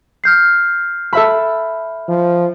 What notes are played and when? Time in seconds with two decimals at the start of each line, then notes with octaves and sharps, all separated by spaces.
0.24 F6 G6 C7
1.13 A4 E5 B5
2.08 F3